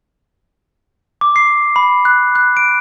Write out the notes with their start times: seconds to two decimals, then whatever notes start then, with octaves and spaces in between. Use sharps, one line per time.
1.21 D6
1.36 C7
1.76 B5
2.05 F#6
2.35 F#6
2.57 D7